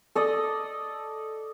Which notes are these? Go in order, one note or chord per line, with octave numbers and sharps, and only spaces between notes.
A4 D5 D#5